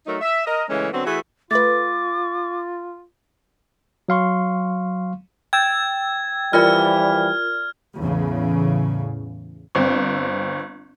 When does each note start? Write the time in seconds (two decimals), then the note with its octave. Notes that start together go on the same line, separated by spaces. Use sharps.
0.06 F#3 A3 D#4 A#4
0.21 E5
0.45 A#4 D#5
0.68 C#3 E3 G#3 A3 C#4
0.92 D3 F#3 B3 C4
1.05 E3 A3 F#4 G#4 B4
1.51 A3 F4 B4 D6 A6
4.09 F#3 F5 C6 C#6
5.53 G5 E6 G#6 A6
6.53 E3 F3 G3 F4 A#4 D5 F6
7.98 E2 A2 C#3
9.75 G1 C4